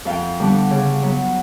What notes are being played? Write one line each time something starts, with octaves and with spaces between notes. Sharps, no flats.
F2 F5 G5
D3 G3 B3 D4
C#3
F#3 B3